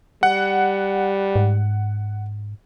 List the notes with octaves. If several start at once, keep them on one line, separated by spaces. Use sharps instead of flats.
G3 F#5
G#2